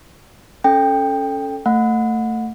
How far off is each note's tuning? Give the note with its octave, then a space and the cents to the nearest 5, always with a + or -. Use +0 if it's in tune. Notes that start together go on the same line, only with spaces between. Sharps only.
C#4 +0 A4 +0 G5 +15
A3 +25 F#5 -30